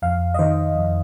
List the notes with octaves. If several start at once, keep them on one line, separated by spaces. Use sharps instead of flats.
F2 F5
D#5
D#3 C5
F2